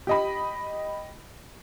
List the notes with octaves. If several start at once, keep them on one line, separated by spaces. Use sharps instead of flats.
G4 D#5 B5